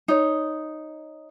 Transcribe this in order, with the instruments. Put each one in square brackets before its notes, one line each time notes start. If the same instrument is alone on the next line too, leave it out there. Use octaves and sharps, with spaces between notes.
[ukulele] D#4 C#5